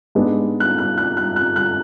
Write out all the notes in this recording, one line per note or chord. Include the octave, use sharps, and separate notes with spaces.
G#2 G#3 B3 D4
F#6
F#6
F#6
F#6
F#6
F#6